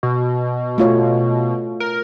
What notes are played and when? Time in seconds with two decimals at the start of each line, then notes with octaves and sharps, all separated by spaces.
0.03 B2
0.78 A3 F4 C#5
1.80 A#4